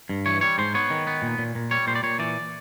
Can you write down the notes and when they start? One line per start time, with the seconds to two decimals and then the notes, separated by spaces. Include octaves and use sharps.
0.09 G2
0.26 E3 C#5
0.41 G3 C#5
0.58 G#2 C5
0.74 B3 C#5
0.90 D#3
1.07 B3
1.22 A#2
1.38 A#2
1.55 A#2
1.71 G3 C#5
1.87 A#2 C5
1.95 D5
2.03 A#2 C#5
2.19 E3 D5